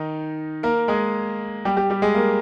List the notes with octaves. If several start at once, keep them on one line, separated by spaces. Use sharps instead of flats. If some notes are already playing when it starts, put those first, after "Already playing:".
Already playing: D#3 D#4
A#3 A#4
G#3 G#4
G3 G4
G3 G4
G3 G4
G#3 G#4
A#3 A#4